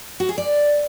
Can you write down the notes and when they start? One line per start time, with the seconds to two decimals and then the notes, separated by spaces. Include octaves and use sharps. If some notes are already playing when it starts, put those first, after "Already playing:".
0.20 F#4
0.29 G#4
0.38 D5